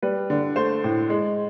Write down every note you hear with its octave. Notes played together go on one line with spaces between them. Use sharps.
G3 B4
D3
A3 C5
A2
G#3